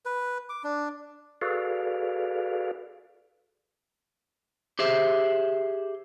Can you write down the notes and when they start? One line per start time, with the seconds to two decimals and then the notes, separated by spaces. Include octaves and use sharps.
0.05 B4
0.49 D6
0.64 D4
1.42 F#4 G#4 A4 B4 D5 F5
4.79 G4 G#4 C5 E5